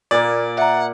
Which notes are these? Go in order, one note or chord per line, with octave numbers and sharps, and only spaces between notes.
A#2 A#3 D5
E5 F#5 A#5